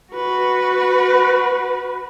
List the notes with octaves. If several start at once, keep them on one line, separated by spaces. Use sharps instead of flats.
F#4 B4